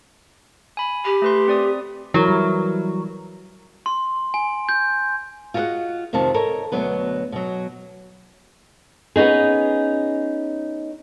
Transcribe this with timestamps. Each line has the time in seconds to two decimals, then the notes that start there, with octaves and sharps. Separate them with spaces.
0.77 G#5 B5
1.05 G4 B5
1.22 A3 B4 C6
1.48 C4 D5 D#6
2.14 E3 F#3 E4 A#4
2.28 G3
3.86 C6
4.34 G#5
4.69 G6
5.54 F4 F#4 G#4 A4 D#5 F#5
6.13 F2 C3 D#3 F3 A5
6.34 A4 A#4 C#5 D#5
6.72 D2 B2 F#3 B3 B4
7.32 B2 F#3
9.16 B3 C#4 D#4 G#4